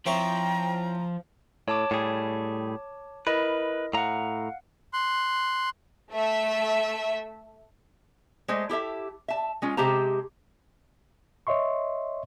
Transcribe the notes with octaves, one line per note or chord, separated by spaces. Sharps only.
F3 C4 E4 C#5 G5 A#5
A2 C#5 A5 D6
A2 G3 G#4
E4 A#4 B4 D#5
A2 F5 F#5 A#5
C6 F#6
A3 E5
G#3 A3 C5 D#5
E4 G4 A4 E5
E5 A5
G#3 C#4 F4
C3 G#3 G4 C5 A5 A#5
C#5 D#5 E5 C6 C#6